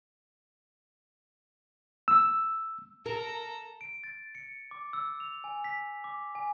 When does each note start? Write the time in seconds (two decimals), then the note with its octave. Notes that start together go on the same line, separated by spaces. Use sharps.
2.08 E6
3.06 A4 A#4 A#5
3.81 D7
4.04 A6
4.35 C#7
4.71 D6
4.93 E6
5.20 F7
5.44 G#5
5.64 B6
6.04 D6
6.35 G#5